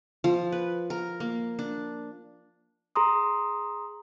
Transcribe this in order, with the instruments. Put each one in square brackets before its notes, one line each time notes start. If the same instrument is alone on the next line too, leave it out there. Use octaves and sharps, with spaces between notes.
[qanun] F3
B4
A#4
A#3
D4
[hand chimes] G#4 A#5 C6 D#6